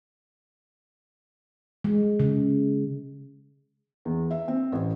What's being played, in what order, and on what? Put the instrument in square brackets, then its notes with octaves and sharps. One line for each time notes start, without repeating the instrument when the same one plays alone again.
[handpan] G#3
C#3
[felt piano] E2
E5
C4
A1